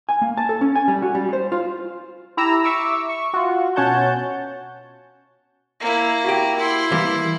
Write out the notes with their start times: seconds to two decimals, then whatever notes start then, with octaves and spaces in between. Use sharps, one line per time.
0.09 G#5
0.22 A#3
0.37 A5
0.49 A4
0.61 C#4
0.75 G#5
0.88 G3
1.02 F#4
1.15 G3
1.33 C5
1.52 F4
2.37 E4 G4 A#5 E6
2.64 E5 C#6 D6 E6
3.09 C#6
3.34 F4 F#4
3.76 B2 C#4 C#5 F#5 A5 G6
5.80 A#3 E4
6.25 F#4 G4
6.58 E4 C6
6.92 E3 G3 A#3